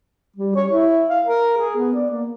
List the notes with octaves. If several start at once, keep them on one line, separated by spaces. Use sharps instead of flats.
G3
C#5
E4
F5
A#4
G#4
B3
D5
A#3